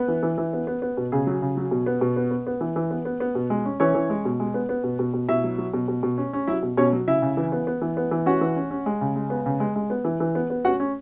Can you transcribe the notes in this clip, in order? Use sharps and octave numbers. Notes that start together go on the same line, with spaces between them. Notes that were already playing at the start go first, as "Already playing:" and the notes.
Already playing: B3 B4
E3
E3
E3
B3
B3
B3
B2
C#3 G#4
F#3
C#3
F#3
B2
B3
B2
B3
B3
B3
E3
E3
B3
B3
B3
B2
G#3
C#4
E3 C#4 C#5
E3
G#3
B2
G#3
B3
B3
B2
B2
B2
B2 E4 E5
F#3
F#3
B2
B2
B2
C#4
C#4
F#3 E4 E5
B2
B2 C#4 C#5
F#3
C#3 E4 E5
C#3
E3
B3
B3
E3
B3
E3
C#4 F#4 F#5
E3
C#4
C#4
G#3
C#3
G#3
B3
C#3
G#3
G#3
B3
E3
E3
B3
B3
C#4 F#4 F#5
C#4